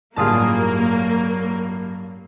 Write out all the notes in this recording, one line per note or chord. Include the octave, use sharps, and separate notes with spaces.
A1 G2 F#3 A#3 F4 G#4 A5